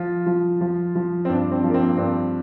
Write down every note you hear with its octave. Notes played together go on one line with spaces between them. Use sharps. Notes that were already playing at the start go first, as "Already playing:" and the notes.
Already playing: F3 F4
F3
F3
F3
C4
G2 D4
C4
F3
A#3
C4
G2 C4